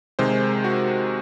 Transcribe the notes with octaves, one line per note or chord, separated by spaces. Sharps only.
C3 D#3 G#3 C5
F#4